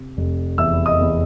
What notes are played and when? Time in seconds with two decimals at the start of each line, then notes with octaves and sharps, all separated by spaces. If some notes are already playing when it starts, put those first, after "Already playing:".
Already playing: C3
0.17 F1
0.58 E2 E5 E6
0.86 D#5 D#6
1.00 E2